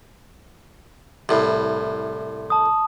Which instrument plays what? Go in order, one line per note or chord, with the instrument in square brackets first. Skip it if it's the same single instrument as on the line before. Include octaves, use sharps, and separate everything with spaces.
[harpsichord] C2 A2
[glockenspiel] A5 D#6